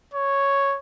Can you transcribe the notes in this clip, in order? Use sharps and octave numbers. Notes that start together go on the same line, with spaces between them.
C#5